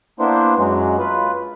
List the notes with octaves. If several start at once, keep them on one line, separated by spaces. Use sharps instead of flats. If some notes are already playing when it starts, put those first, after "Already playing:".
A#3 B3 D4 E4 C5
F#2 F#3 G#3
F4 B4